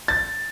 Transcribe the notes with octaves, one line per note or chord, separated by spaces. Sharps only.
A6